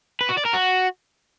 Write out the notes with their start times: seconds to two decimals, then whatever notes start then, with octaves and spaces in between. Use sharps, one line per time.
0.21 B4
0.29 F#4
0.38 D5
0.46 A#4
0.54 F#4